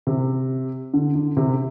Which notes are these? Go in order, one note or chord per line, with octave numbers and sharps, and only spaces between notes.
C3
D3
D3
C3